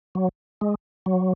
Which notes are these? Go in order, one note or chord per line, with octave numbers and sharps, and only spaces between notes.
F#3
G#3
F#3